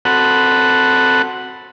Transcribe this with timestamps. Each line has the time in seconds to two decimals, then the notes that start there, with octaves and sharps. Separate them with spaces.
0.05 C4 F#4 A4 F#5 B5